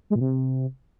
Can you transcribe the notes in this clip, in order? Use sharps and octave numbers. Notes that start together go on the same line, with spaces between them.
G#3
A#2
C3